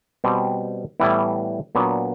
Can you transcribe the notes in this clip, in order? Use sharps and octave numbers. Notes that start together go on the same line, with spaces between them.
B2 G3 C4
A2 E3 G3 B3 E4
A#2 F#3 B3 D4